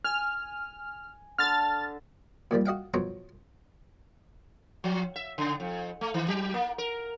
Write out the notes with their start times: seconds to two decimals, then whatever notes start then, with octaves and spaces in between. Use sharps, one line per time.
0.04 G#5 F6
1.38 D3 A5 F6 A6
2.51 A#2 D#3 F3 G3
2.66 F#4 D#5 F5 G5
2.94 F2 B2 F#3 C#5 A#5 C6
4.84 F3
5.16 E5
5.38 C#3
5.60 F2
6.01 A3
6.14 D#3
6.28 F#3
6.54 A#3
6.78 A#4